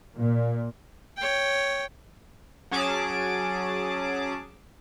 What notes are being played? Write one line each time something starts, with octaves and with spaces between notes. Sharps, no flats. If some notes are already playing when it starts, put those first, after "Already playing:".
A#2
C#5 G5
F#3 C#4 G#4 A5 D6